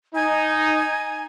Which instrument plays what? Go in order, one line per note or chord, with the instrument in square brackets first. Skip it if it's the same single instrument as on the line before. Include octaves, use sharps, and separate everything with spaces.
[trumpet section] D#4 [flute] G#5